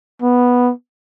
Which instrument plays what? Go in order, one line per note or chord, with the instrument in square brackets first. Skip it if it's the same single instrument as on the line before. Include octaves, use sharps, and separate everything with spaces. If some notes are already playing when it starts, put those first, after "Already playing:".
[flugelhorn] B3